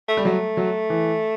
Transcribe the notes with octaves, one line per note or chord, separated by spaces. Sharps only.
A3
G3
F#3 A3
F#3
E3